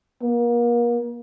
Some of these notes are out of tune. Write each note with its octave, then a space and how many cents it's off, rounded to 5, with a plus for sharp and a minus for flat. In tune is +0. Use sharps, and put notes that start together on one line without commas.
A#3 +35